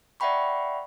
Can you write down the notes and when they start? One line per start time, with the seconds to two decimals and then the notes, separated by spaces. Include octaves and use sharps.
0.20 D5 E5 F#5 G5 B5 C#6